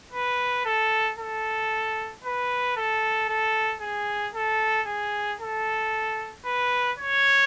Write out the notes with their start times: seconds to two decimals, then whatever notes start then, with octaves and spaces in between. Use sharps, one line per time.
0.13 B4
0.65 A4
1.19 A4
2.24 B4
2.77 A4
3.29 A4
3.81 G#4
4.34 A4
4.87 G#4
5.40 A4
6.45 B4
6.98 C#5